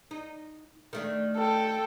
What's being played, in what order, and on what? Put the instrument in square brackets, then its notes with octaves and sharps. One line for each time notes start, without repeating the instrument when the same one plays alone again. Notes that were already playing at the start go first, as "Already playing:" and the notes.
[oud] D#4
D#3 A3 D4
[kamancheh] A4 G5